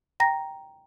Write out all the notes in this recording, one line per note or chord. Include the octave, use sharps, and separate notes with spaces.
G5 A#5 A#6